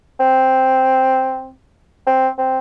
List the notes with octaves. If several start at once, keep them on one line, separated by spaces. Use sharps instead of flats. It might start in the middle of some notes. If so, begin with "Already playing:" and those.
C4
C4
C4